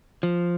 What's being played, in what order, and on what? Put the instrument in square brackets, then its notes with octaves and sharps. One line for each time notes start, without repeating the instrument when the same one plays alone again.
[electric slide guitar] F3